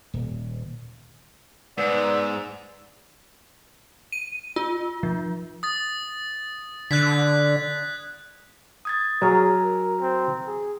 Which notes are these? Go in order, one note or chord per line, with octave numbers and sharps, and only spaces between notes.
D#1
G#2 B3 D5 E6
D#7
F4
F3
D#6 A6
D3 F#6 G#6 B6
D#6 G#6 A6
F#3 G#4 A#5 F6
A#4
C4
G#4